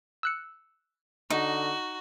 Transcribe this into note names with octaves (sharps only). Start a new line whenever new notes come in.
E6 F#6 C#7
D3 D#4 F#4